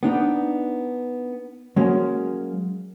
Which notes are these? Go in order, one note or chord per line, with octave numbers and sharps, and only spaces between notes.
B3 D4 D#4
F#3 G#3 A#3 C#4